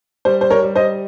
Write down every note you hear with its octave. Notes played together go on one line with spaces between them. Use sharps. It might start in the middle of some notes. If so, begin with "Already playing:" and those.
G3 C5
C5
A#4 C#5
G3
C5 D#5